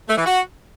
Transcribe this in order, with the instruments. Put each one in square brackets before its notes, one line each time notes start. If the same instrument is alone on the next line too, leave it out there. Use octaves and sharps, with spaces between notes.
[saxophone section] A3
E3
F#4